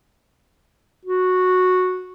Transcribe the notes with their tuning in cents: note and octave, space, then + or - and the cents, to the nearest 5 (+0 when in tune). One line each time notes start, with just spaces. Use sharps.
F#4 -10